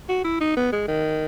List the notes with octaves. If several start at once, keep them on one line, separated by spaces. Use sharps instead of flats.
F#4
E4
D#4
B3
G#3
D#3